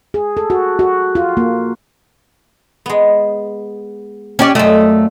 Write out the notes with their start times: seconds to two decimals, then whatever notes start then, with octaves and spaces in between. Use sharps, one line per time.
0.14 G#4
0.37 A4
0.50 F#4
0.79 F#4
1.15 F4
1.37 A#3
2.86 G#3 B3
4.39 C#4 G4 D5
4.55 F#2 A3 F4 D5 D#5